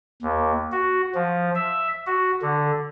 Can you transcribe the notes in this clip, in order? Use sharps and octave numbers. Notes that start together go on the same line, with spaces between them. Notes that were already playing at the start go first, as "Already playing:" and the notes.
D#2
F#4
F3
E5
F#4
D3